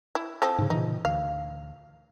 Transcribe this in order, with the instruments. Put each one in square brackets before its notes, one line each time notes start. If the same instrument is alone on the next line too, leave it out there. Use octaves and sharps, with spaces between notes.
[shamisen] E4
F3 C4 A4
[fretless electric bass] G#2 C#3
[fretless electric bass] A#2 C#3 E3 [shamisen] D#4
[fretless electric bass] D2 [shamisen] F5